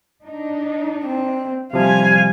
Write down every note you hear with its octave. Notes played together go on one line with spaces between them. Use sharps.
D4 D#4
C4
C3 F3 G3 F5 G#5